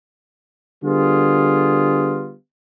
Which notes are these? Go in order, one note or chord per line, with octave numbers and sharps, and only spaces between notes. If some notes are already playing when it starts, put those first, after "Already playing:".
D3 G3 B3 F4 G#4